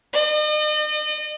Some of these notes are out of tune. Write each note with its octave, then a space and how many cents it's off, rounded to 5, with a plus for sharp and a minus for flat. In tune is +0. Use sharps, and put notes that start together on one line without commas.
D#5 -40